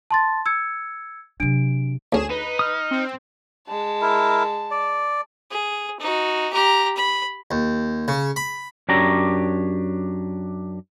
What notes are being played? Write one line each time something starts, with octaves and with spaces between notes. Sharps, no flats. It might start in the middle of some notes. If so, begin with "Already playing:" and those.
A5 C6 A6
E6 G#6 C#7
C3 F#3 D4 D7
D2 C#4 G#4 E7
D#4 B4
D#6 F6
C4
G#3 A5
E4 A#4
D5
G#4
D#4 F#4
G4 A#5
B5
D#2
C#3
B5
F#2 D4 G4 C#5 A#5